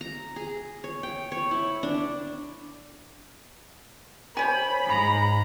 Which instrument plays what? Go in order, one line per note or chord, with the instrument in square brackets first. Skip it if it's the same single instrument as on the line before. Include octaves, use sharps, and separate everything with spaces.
[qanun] A#5
G#4
C#5
G5
C#5
E4
D4
[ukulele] C5 C#5 G#5 [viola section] B5
[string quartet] G#2 A#5